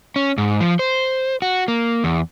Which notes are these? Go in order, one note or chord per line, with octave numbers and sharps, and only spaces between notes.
C#4
G#2
F3
C5
F#4
A#3
E2